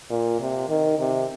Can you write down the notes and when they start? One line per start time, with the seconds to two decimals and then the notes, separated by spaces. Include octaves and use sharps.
0.10 A#2
0.40 C3
0.69 D#3
0.99 C3